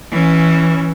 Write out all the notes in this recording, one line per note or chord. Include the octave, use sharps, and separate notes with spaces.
E3 C#4